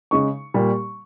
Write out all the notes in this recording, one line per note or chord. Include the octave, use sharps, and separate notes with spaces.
C#3 G#3 C#6
A#2 G3